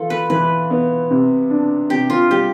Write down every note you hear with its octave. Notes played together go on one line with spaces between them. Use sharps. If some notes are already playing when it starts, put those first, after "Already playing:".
Already playing: E3 F4 A4
B4
E3 B4
B3
C3
D4
C3 G4
F4
G3 G4